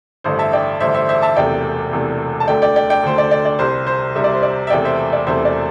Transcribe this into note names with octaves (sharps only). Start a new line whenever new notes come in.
A1 G2 D3 C5
E5 A5
D5 G5
A1 G2 D3 C5 E5
C5 E5
C5 E5
E5 A5
E1 E2 C3 A3 D5 G5
E1 E2 C3 A3
A5
D2 D3 A3 D5 G5
D5 G5
D5 G5
D5 G5
D2 D3 A3 C5
D5
D5
D5
C2 C3 G3 C5
C5
C2 C3 G3 E5
D5
C5
D5
E5
E1 E2 C3 A3 D5 G5
C5 E5
D5
E1 E2 C3 A3 C5 E5
D5